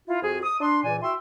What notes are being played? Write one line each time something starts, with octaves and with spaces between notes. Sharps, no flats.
E4 F4
F2 F4 F#4 G#4
D#6
D4 C6
C#2 A#2 E3 D5 G#5
E4 F#4 E5 G5 C6